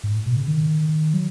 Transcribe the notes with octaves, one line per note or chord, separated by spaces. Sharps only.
G#2
A2
B2
C#3
D#3
F#3